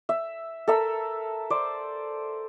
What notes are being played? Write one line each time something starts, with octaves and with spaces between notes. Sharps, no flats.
E5
A4 A#4 E5 E6
C5 D5